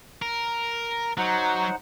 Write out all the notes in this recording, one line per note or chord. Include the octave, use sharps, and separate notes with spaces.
A#4
F#3 D#4 C5 F#5